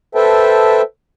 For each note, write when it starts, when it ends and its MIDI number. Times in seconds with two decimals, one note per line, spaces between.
0.15 0.82 69
0.15 0.82 71
0.15 0.82 72
0.15 0.82 76
0.15 0.82 79
0.15 0.82 81